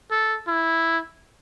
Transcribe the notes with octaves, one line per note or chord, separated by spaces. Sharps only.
A4
E4